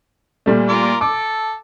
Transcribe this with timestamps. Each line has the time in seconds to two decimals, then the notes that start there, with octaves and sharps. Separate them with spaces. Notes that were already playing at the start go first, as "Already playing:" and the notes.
0.46 A#2 G3 A3
0.68 F4 A#4 D5
1.01 A4 D6